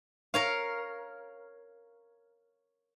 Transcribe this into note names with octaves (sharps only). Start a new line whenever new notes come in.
A#4 C#5 F5